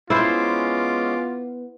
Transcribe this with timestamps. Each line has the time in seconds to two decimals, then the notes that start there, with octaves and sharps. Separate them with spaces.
0.10 G#3 B3 C#4 E4 F4 C5 D6